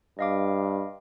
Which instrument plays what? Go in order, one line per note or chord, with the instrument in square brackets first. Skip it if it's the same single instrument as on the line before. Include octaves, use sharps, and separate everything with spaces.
[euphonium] G2 [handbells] D#5 F5 D6